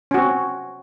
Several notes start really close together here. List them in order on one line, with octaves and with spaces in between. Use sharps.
C#4 F#4 C4